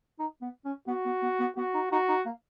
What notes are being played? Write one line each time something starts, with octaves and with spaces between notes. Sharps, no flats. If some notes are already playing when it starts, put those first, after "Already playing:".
D#4
B3
C#4
B3 F#4
B3
B3
B3
B3 F#4
D#4
D#4 F#4
D#4
A#3